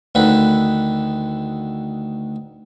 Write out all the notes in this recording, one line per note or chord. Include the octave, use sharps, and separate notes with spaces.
D2 D3 D#3 B4